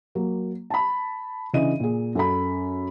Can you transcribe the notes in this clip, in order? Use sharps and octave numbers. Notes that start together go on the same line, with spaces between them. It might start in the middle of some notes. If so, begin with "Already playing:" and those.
F#3 A#3
A5 B5
C#3 E3 D4 D#5 D#7
A#2 G#4
F#2 A4 B5